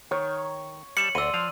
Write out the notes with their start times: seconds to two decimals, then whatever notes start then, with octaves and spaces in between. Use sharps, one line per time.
0.11 D#3 C#5
0.97 G3 E5 A5 C#7 F#7
1.15 D2 D5 C6 E6 D#7
1.34 F3 F5